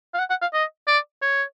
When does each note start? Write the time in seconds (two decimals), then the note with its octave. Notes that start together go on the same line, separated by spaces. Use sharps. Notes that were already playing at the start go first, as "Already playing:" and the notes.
0.14 F5
0.19 F#5
0.30 F#5
0.41 F5
0.53 D#5
0.87 D5
1.22 C#5